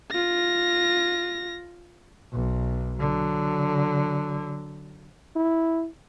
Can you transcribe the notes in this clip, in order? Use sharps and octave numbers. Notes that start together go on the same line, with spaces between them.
F4 A#6
B1
D3 F#3
E4